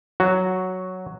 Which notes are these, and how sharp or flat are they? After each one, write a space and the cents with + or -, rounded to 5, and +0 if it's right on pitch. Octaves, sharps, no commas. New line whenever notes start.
F#3 +0 F#4 +0